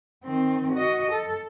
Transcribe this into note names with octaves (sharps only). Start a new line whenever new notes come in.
D#3 C4
F#4 D#5
A4